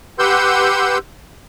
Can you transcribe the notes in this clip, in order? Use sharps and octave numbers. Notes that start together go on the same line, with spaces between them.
G4 B4 F#5 C6 E6 G6